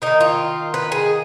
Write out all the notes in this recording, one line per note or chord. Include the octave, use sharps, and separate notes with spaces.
D#3 A#3 D#4
F4
B4
G#4